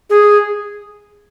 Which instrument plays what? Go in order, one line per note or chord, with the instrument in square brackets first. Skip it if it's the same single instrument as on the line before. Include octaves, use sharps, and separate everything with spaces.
[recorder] G#4